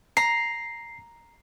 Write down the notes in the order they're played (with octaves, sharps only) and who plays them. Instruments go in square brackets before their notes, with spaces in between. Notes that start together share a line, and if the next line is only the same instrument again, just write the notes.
[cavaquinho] A#5 [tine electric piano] C7